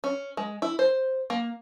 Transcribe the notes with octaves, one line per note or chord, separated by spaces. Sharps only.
C#4
G#3
E4
C5
A#3